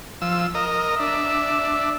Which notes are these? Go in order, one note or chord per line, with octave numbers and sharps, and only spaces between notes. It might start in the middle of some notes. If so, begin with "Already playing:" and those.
F3 E6
A#4 D#5
D4 E5